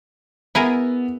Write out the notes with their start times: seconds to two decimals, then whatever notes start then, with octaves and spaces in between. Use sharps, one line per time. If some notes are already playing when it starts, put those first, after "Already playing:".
0.55 B3 E4 G#4 A#4